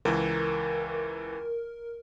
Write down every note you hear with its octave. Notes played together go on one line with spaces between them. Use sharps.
C#2 E3 A#4